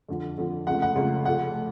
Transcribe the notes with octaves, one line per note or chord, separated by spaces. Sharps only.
F2 D3 F3
F2 D3 F3
C#2 C#3 F3 A3 F#5
F#5
C#2 C#3 F3 A3
F1 F2 F3 A3 F#5